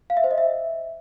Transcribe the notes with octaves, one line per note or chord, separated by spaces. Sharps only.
F5
E5
C5
D#5
E5